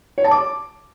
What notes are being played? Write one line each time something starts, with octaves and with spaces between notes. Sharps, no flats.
C#5
A5
D6